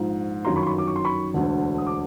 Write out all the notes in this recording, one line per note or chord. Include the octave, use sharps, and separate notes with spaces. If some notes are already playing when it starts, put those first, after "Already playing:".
Already playing: A#1 G#2 F3
G1 F#2 D#3 A#5 C6
B5 C#6
C6
B5 C#6
D6
C#6
C6
B5 C#6
E1 D2 D3
D#6
D6